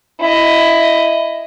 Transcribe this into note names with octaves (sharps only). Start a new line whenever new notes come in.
E4 D#5